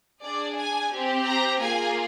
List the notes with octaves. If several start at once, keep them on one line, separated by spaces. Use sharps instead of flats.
D4 G#4 D5
G#5
C4 G4
A#5
A#3 F4 G#4 G#5